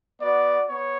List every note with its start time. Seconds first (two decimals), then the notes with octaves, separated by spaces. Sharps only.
0.21 B3 F#4 D5
0.69 B3 C#5